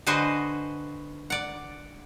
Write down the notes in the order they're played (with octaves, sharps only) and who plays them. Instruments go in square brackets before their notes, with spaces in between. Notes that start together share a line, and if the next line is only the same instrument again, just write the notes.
[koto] D3 F#4 B4 C5 D#5 G#5
D5 F#5